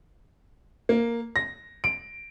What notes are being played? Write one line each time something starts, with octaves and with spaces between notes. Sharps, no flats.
A#3
A#6
D7